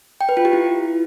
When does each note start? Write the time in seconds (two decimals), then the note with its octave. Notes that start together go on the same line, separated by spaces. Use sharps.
0.21 G5
0.29 B4
0.37 F4
0.45 G4
0.53 E4